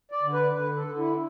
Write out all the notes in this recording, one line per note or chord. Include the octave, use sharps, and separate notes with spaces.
D5
D3
B4
D3 B4
A4
D3
E4